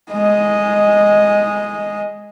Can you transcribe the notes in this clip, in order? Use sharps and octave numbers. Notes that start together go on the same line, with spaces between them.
G#3 D#5